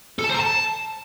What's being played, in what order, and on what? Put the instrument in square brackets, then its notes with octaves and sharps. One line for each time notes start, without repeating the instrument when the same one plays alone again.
[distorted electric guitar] A4
A5
C5
A#5
A5